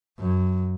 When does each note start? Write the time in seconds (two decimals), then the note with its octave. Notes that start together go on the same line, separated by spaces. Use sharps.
0.19 F#2